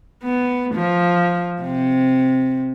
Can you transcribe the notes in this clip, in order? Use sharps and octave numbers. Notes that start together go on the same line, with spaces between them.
B3
F3
C3